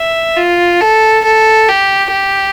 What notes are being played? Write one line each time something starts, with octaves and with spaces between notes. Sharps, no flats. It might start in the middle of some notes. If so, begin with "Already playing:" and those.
Already playing: E5
F4
A4
A4
G4
G4